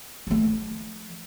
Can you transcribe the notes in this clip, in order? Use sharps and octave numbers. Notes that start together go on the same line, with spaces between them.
F3 A3